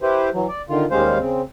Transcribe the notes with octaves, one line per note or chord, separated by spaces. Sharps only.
E4 G4 B4 C5
E3 F#3
D5
D3 D#3 F4
D#2 G3 G#3 C#4 C5 F5
C#3 C4